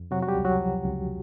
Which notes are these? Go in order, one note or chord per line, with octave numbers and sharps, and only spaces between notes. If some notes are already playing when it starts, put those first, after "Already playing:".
Already playing: F2
C3 F#3 F#4
F#4
G3 G4
C#2
F#3 F#4
F3
C#2